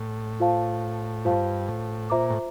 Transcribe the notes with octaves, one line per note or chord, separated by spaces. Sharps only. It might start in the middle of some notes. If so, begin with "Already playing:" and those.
Already playing: A2
F4 C5 F5 A5
G2 F4 C5 F5 A5
A2
A#2 F4 C5 E5 A#5 D6
A2